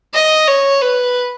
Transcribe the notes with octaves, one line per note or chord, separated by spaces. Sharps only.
D#5
C#5
B4